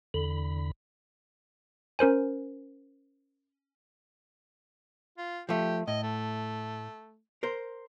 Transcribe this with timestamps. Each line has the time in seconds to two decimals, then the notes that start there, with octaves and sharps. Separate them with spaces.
0.14 E2 D3 B5
1.99 C#4 A#4 C5 G#5
5.18 F4
5.49 F3 A3 G4
5.88 A2 D#5
6.03 A3
7.43 A#4 C5